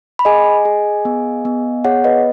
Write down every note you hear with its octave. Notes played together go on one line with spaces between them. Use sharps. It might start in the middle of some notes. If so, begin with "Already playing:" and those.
B5
G#4 D#5 G#5
G#4
B3
B3
G#4 C#5 F#5
B4 D#5